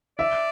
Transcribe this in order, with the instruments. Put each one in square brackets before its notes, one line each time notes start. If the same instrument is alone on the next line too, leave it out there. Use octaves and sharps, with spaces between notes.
[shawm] D5 [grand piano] E5